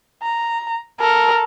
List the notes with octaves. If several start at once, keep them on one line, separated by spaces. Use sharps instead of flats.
A#5
A4 A#4